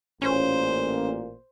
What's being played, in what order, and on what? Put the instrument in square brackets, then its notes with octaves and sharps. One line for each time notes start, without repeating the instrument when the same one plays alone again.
[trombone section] A1 A#2 [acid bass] C#4 [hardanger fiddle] C5